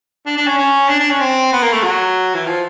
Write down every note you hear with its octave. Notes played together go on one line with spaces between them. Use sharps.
D4
D4
C#4
C#4
D4
D4
C#4
C4
B3
A#3
A3
F#3
E3
F3